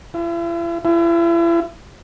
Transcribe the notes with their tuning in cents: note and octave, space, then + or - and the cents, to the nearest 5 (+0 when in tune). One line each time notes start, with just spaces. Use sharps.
E4 +45
E4 +40